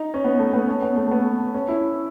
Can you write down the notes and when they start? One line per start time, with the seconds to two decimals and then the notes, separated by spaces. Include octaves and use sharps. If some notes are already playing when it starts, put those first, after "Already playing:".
Already playing: D#4
0.14 C#4
0.24 B3
0.39 A3
0.53 B3
0.68 C#4
0.82 B3
0.96 A3
1.06 A3
1.11 B3
1.54 C#4
1.68 E4